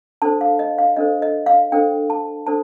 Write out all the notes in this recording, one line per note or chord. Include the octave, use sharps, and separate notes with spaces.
D4 A4 C5 A5
F5
D#5
F5
D4 A4 C5 D#5
D#5
F5
D4 A4 C5 G5
A5
D4 A4 C5 A5